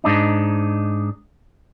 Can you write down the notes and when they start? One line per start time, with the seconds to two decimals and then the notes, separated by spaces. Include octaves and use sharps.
0.04 G#2 D4 D#4